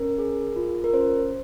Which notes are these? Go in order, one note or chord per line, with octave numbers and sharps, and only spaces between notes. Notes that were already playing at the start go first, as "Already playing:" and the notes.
Already playing: C#4 A#4
G#4
F4
A#4
C#4 C5